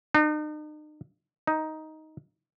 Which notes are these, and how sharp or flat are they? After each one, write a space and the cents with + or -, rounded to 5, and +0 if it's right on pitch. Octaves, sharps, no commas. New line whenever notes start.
D#4 -40
D#4 +10